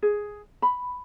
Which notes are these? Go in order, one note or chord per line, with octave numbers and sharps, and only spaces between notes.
G#4
B5